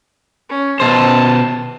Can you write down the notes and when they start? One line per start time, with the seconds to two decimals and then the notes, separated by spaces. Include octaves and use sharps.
0.50 C#4
0.80 B2 C5 A5